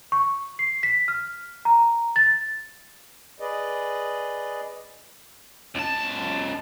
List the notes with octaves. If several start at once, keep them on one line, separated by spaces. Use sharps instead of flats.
C#6
C7
B6
F6
A#5
A6
G#4 B4 D5 D#5
C#2 A5